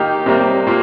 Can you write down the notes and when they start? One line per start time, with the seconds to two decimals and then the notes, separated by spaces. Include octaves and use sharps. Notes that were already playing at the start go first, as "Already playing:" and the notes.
Already playing: D#3 A#3 D#4 G4
0.26 C3 G3 A#3
0.66 A#2 A#3